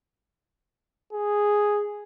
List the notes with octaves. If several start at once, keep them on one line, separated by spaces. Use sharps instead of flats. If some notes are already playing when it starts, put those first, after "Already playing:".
G#4